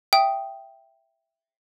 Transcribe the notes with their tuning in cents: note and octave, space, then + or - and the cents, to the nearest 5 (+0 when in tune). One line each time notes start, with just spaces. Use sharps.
E5 +10 G5 +0 D#6 +0